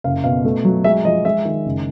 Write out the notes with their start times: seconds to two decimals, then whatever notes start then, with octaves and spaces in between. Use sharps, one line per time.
0.04 F#1 F5
0.24 B2 F5
0.45 A3
0.65 F#3
0.84 G#3 E5
1.05 F3 D#5
1.25 G#3 E5
1.45 D#3
1.66 F#1